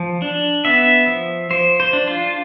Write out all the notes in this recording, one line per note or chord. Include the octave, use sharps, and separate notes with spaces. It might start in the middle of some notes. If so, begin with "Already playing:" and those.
Already playing: F3
D4
B3 E5
F3
F3 C5
C5
D4
F4